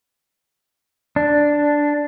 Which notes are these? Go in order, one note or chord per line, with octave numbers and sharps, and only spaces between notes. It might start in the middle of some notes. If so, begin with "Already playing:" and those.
D4